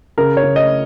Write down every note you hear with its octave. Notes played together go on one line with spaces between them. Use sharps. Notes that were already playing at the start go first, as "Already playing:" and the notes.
C#3 A#4
C#5
C#3
D#5